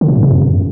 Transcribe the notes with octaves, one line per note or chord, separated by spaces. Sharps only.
D3
C3
G#2
C3
F#2